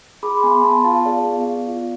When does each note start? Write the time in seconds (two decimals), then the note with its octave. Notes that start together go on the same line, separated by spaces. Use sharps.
0.23 G#4 B5 D6
0.37 C6
0.43 B3 G#5 B5
0.64 B3 A5 C6
0.84 F4 F5 A5
1.05 G#4 D5 F5
1.25 B3
1.47 B3
1.67 F4